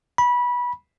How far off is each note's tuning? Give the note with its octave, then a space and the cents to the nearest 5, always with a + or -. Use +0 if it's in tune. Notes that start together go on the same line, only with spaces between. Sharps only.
B5 -20